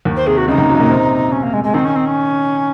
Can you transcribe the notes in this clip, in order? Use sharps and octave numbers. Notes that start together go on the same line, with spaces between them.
D#2 D#3
C5
C3 G#4
F#4
C#2 C#3 D#4
D#2 D#3
F#2 F#3
A#2 A#3
C3 C4
C#4
A#3
G#3
G#3
D#3 C4 D#4
C#4
C4
C#4